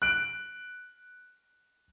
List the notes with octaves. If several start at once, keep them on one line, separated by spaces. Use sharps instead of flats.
F#6 D7